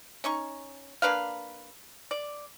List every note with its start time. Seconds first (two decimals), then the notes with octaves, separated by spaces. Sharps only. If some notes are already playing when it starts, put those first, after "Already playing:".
0.24 C#4 D#4 C#6
1.02 A#3 D4 B4 F5
2.11 D5